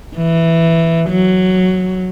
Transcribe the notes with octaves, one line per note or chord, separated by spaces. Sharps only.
E3
F#3